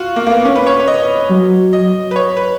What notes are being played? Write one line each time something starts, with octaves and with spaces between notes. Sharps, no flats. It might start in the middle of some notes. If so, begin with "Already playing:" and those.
Already playing: F4 F#4
A#3
A#3
B3
C#4
B4
C#5
C#5
D#5
F#3
D#5
B4
C#5
B4